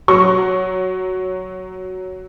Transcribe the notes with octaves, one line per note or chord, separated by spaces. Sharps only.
F#3 C#6